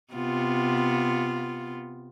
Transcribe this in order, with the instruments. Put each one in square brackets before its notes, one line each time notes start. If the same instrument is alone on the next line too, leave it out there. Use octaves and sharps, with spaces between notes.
[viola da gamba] C3 B3 F4